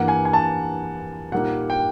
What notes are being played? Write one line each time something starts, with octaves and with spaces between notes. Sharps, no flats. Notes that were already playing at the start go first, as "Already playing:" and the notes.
Already playing: G2 E3 G3 A#3 F#5
G#5
G#5
A5
A#2 G3 A#3 D#4 F#5
G5